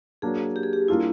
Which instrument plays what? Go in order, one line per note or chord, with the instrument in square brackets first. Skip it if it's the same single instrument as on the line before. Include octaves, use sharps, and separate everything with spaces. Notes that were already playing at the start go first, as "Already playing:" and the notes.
[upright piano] F#3 A#3 D4 [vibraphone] G#4
[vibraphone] G4
G#4
G4
[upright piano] G3 A#3 D4 F4 G#4 [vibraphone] E4